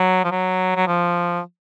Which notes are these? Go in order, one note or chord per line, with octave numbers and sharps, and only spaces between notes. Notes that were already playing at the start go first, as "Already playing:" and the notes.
Already playing: F#3
F3
F#3
F#3
F3